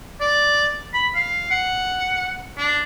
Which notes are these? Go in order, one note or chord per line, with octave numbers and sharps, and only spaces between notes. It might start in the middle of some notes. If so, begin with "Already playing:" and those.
D5
B5
F5
F#5
D4